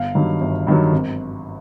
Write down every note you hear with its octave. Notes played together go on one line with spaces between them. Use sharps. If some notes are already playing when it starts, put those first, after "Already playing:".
Already playing: G1 F5
G2 D#3 F#3
G1
G2 D#3 F#3
G#1